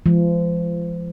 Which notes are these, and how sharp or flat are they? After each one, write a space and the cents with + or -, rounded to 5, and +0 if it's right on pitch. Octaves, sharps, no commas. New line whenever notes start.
F3 -35 G#3 +0